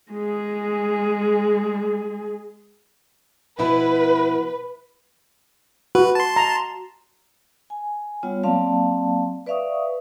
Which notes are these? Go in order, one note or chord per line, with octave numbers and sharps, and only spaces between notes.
G#3 G#4
B2 F3 E4 B4
F#4 B4
A5 C6
A#5
G#5
G3 B3 F4 C#5 F#5
F#3 A#3 C4 D5 F5 A5
B4 D5 E5 F5 C#6 D#6